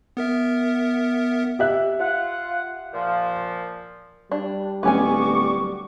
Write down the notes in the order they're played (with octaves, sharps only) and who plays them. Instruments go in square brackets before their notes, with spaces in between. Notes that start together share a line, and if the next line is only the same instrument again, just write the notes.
[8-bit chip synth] B3 A#4 E5
[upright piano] G4 E5 F#6
[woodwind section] F4 F#5
A#2 F3
[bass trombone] G3 [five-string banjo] D4
[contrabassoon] D1 [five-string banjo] B3 C#4 G#5 [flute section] C#6 D6